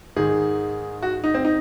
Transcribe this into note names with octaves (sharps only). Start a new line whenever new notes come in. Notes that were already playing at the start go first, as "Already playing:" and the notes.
G#2 D#3 G#4
F#4
D#4
C4
D#4